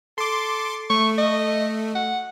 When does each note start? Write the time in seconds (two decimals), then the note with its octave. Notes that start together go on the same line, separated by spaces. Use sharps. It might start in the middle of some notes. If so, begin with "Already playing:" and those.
0.18 A4 C6 D6
0.90 A3 C#6
1.18 D#5
1.95 F#5